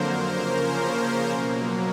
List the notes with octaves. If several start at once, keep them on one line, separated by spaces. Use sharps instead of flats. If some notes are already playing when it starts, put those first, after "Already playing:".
Already playing: F2 D3 F#3 A#3 A#4 C5
C#3 F3 A#3 C#4 A#4 C5
B2 F#3 A#3